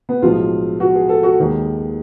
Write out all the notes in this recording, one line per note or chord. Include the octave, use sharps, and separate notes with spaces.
B3
B1 A2 F3 G#3 F4
F#4
G#4
A4
F#4
D#2 D#3 G#3